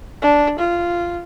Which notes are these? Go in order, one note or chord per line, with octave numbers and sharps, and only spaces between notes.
D4
F4